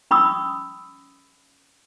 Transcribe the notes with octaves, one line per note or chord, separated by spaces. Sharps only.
C#4 B5 C#6 D#6 E6